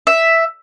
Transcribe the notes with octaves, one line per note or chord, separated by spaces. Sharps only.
E5